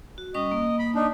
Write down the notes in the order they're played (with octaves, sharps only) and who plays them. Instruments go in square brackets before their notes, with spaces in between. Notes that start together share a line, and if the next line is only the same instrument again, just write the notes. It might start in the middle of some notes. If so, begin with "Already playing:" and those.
[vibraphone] F#4
[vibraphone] G3 C#4 C#6 [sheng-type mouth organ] D#5
[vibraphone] A#3
[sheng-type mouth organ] B5
D4 D#4